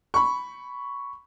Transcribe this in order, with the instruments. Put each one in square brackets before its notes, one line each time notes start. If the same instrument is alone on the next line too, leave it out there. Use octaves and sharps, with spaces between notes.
[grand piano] B5 C#6